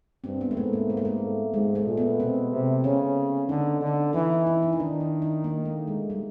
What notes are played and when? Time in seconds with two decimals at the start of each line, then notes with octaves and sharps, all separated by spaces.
0.24 G2 C4
0.41 B3
0.51 A3
0.57 G#2 A#3
0.73 A#3
0.90 A3
0.97 A#3
1.05 A3
1.54 G#2 G#3
1.75 A3
1.86 A#2
1.97 B3
2.20 B2 C4
2.52 C3
2.84 C#3 C#4
3.49 D3 D#4
3.81 D3
4.14 E3 D#4
4.46 E4
4.62 D#4
4.73 D#4
4.79 D#3 D4
5.00 D#4
5.22 D#4
5.44 A#3
5.65 A3
5.87 G#3
6.10 G3